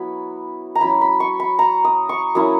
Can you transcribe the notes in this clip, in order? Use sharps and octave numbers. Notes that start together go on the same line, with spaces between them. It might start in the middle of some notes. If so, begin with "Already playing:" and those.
Already playing: F#3 B3 E4 B5
A#5
F#3 C#4 E4 B5
B5
C#6
B5
A#5
D#6
C#6
F#3 A#3 C#4 E4 D#6